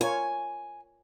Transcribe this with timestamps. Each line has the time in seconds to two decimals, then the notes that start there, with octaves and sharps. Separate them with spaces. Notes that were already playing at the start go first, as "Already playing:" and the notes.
0.01 F4 A#4 C#5 G#5